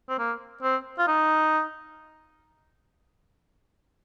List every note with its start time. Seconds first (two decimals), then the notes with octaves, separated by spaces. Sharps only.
0.09 C4
0.19 A#3
0.63 C4
0.98 F4
1.08 D#4